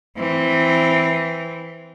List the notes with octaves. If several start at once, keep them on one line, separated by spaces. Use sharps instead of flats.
E3 C4